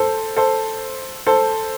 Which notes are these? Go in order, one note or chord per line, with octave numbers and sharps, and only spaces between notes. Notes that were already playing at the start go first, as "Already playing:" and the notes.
Already playing: A4 C5
A4 C5
A4 C5